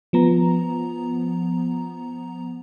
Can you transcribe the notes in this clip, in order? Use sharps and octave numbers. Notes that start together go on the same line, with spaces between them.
F3 B3 A#5